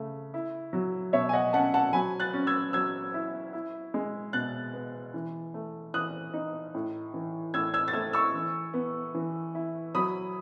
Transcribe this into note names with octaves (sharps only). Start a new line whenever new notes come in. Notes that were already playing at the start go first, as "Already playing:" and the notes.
Already playing: C#3 A3
E4
F#3
B2 C#5 E5
G#5
D#5 F#5
C#4 F#5 A5
F#5 A5
F#3 G#5 B5
F#6 A6
C#4
E6 G#6
F#3 E6 G#6
E4
E4
G#3
B2 F#6 A6
B3
E3
A3
E3 D#6 F#6
D#4
A2
E3
A2 E6 G#6
E6 G#6
A6
A3 E6 G#6
C#6 E6
E3
B3
E3
E4
F#3 B5 D#6